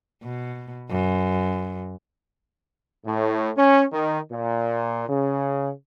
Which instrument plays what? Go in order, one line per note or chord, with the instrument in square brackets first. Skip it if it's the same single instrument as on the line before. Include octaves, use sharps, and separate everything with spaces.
[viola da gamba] B2
F#2
[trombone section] A2
C#4
D#3
A#2
C#3